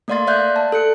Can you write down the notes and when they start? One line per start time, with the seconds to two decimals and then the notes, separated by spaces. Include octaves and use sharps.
0.08 A3 A#3 D5 F5 C6 A6
0.27 D5 E5 F5 F#6 G6
0.56 A5
0.72 A4 F#6 C#7